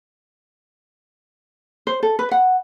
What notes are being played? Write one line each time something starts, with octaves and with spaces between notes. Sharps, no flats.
C5
A4
B4
F#5